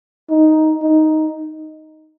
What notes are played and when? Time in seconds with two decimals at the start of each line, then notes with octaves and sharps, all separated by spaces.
0.30 D#4
0.82 D#4